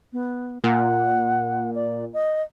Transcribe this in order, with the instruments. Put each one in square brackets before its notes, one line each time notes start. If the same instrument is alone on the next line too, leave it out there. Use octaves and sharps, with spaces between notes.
[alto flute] B3
[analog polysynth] A#2 [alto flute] F#5
[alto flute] D5
D#5